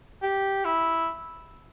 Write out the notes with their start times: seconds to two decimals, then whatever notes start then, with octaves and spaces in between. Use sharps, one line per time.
0.23 G4
0.65 E4